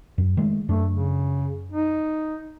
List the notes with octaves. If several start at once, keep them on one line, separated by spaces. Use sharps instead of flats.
F#2
D#3 G#3 A3
F#2 A3 D4
C#3
D#4